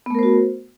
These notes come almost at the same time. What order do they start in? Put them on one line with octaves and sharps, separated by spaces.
B3 A3 A#4 C5 F#4